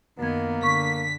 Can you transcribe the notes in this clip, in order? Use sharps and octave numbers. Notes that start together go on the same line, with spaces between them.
F#2 D#3 A#3 B3 G#6
D3 C#6 B6